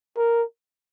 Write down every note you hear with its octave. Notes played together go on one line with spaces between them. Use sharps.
A#4